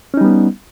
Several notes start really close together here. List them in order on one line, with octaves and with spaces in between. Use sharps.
C#4 D#4 G3 B3